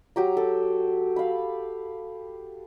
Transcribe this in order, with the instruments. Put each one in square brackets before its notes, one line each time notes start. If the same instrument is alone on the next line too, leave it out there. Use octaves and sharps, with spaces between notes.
[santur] F#3 G4 A#5
A4
F5 B5